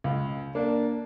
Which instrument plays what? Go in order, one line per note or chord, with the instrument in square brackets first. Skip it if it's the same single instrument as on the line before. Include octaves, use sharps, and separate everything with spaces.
[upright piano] C#2
[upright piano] A#3 [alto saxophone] D4